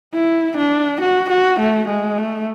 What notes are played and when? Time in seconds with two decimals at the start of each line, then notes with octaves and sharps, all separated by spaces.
0.14 E4
0.57 D4
1.01 F#4
1.30 F#4
1.60 A3
1.89 G#3
2.18 A3